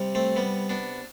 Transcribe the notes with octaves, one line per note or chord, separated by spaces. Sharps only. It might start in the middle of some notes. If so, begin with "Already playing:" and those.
Already playing: C3 G3
A3 C4
G3 B3
B3 D4